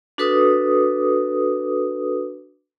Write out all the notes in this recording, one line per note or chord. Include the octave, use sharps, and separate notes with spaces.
D4 F#4 A4 B4 D6 D#6